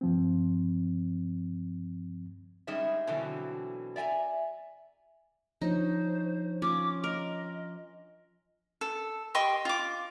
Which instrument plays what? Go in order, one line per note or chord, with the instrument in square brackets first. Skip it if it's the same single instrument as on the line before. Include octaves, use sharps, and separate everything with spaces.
[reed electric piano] G2 F3 C4
[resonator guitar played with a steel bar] G3 G#3 C#4 D#4 E5
B2 D3 E3 F#3 C4
D5 E5 G5 G#5 A#5
[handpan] F3 D4 C#5 [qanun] D#4 [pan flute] C5
[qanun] C#4 [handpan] F4 [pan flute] D6
[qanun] A#4 [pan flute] D#5
[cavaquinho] A4
G4 D#5 C6 C#6
F4 D6